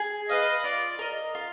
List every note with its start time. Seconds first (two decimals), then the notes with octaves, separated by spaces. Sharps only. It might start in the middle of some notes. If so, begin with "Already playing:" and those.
Already playing: G#4
0.29 B4 D#5 F5
0.64 F4 D5
0.99 A#4 D#5
1.35 F4